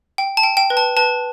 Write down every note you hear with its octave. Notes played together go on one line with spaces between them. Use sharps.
G5
A5
G5
G5
B4
A5
B4 A5